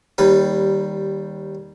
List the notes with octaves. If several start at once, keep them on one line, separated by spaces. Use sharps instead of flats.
D#2 G3 B4